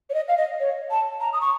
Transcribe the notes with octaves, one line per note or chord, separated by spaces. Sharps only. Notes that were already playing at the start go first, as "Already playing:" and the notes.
C#5
D#5
F5
D#5
C#5
A5
A#5
D#6
C#6